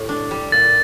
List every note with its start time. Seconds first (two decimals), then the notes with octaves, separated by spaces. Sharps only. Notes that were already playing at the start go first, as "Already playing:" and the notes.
Already playing: A2 D3 G4
0.09 D4
0.31 G3
0.52 A#2 A6